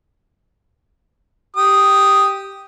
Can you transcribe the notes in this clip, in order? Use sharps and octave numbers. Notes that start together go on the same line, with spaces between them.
G4 D#6